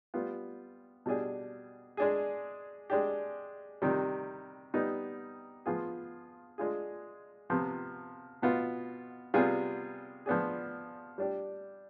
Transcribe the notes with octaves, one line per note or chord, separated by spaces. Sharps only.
G3 B3 F4
B2 G3 D4 G#4
G#3 D4 G#4
G#3 D4 G4
C3 D#3 G3
G3 B3 D#4
F3 B3 F4 G#4
G#3 D4 F4 G#4
C3 F3 B3
B2 B3 F4
C3 G3 B3 F4 G#4
F3 B3 D4 G#4
G3 D4 G4